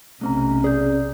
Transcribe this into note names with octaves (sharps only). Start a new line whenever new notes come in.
B1 C3 A3 C4 C#4 A#5
G#4 D5 G6